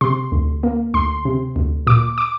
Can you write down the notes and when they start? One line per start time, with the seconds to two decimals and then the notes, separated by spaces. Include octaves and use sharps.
0.01 C3 C6
0.32 D2
0.63 A#3
0.94 D2 C6
1.25 C3
1.56 D2
1.87 A#2 D6
2.18 D6